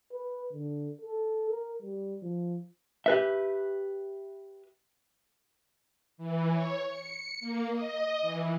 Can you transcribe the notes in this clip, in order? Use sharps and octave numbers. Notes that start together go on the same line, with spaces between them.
B4
D3
A4
A#4
G3
F3
G4 B4 E5
E3
C#5
C#7
A#3
D#5
E3